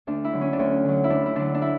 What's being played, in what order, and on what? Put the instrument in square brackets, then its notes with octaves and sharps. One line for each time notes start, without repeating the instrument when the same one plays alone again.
[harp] D2 D4
E4
D3 F#3
C#4
D4
D2 C#4
D3 F#3
E4
D2 D4
E4
D3 F#3 D4
D4
E4